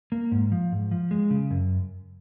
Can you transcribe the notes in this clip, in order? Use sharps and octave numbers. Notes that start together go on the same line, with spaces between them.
A#3
G#2
F3
G#2
F3
G#3
C#3
F#2